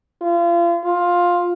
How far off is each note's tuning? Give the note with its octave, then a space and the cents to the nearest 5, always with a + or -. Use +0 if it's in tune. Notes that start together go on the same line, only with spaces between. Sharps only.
F4 -35
F4 +10